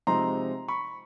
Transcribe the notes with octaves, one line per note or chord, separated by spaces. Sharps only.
C3 F3 G#3 C4 D#4 A#5 C6
B5 C#6